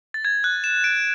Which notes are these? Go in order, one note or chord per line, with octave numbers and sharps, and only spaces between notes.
A6
G#6
F#6
E7
D7